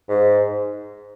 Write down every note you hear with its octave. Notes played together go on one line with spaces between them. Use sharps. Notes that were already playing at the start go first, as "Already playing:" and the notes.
G#2